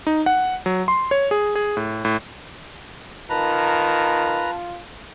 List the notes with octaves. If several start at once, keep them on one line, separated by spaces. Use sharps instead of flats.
D#4
F#5
F#3
C6
C#5
G#4
G#4
A2
A2
D#3 F4 B4 A5 A#5